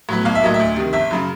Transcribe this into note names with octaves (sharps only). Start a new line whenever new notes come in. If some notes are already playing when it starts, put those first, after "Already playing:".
A2 F#3 B3
B1 F5
E5
A2 F#3 A#3 D#5
E5
D2
C3 D#3
G1 E5
F#2 C#3